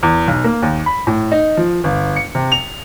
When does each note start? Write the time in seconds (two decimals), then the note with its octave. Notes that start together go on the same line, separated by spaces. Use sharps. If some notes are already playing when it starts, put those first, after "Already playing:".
0.03 E2
0.27 B1
0.44 A#3
0.62 D#2
0.86 B5
1.07 A2
1.32 D#4
1.57 F3
1.84 G1
2.16 C#7
2.35 C3
2.52 F7